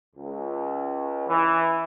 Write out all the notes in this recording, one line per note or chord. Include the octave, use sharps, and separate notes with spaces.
C#2
E3